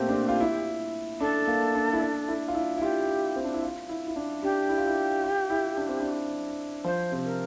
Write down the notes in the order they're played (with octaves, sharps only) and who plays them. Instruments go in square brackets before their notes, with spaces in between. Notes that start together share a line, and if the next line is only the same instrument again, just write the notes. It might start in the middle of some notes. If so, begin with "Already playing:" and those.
Already playing: [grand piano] A#2 A3 A#3 C4 [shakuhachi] G4
[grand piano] D4
C4
F4
E4
[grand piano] D4 [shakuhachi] A4
[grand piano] A#3
D4
E4
D4
E4
F4
E4
E4
[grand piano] F4 [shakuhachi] G4
[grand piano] C4
D4
E4
F4
E4
E4
D4
[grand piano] D4 [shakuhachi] G4
[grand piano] E4
F4
E4
F4
E4
D4
C4
D4
[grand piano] F3 [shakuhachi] C5
[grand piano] C3
[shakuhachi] A#4